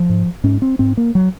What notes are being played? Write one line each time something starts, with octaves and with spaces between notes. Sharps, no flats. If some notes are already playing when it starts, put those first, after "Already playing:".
Already playing: F3
G#2
G#2 C#4
C4
G#2 C4
A#3
F#3